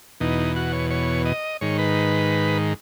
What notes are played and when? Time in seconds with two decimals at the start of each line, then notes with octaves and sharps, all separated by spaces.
0.20 E2 B2 D#4
0.56 F#4
0.72 C#5
0.90 C#5
1.25 D#5
1.61 G#2 D#3 C#5
1.79 B4